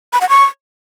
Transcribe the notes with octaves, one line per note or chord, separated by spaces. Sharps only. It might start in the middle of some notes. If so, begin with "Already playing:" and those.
B5
F#5
C#6